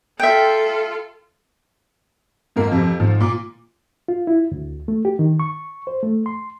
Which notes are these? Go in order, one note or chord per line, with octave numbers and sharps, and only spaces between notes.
F4 A4 E5 G5
F2 G#2 A#3
F2 C3 F3
G#2 F3
A#2 D6
F4
E4
D2
A3
G4
D#3
C#6
C5
A3
C6